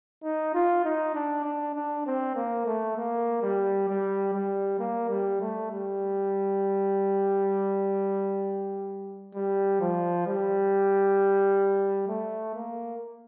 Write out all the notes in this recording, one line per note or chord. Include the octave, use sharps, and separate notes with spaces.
D#4
F4
D#4
D4
D4
D4
C4
A#3
A3
A#3
G3
G3
G3
A#3
G3
A3
G3
G3
F3
G3
A3
A#3